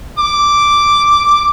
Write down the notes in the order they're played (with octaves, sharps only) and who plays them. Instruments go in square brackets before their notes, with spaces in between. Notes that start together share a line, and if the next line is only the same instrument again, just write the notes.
[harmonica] D6